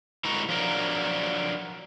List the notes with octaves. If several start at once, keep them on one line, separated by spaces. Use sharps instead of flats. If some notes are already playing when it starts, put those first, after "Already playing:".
D3 G#3 E4 F#4 A#4 A#5
F3 F#3 D4 A#4